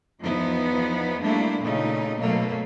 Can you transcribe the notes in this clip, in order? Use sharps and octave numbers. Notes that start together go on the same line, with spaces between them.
E2 F3 B3 D#4 E4
G3 A3 A#3 D4 E4
A#2 C#3 A3 D#4
B2 F#3 A3 A#3